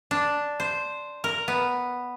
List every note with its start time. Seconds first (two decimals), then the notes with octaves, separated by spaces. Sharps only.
0.11 D4
0.60 C5
1.24 A#4
1.48 B3